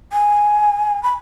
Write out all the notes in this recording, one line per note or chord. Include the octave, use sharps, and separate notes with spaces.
G#5
B5